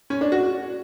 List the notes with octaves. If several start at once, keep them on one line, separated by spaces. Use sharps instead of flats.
C#4
D4
F#4